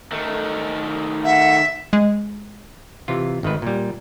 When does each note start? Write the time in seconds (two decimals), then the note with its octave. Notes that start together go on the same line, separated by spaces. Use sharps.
0.12 D#3 A3
1.24 E5 F#5
1.93 G#3
3.08 C3 E3 F4
3.43 G#1 D#3 A3 B4
3.62 A#2 G3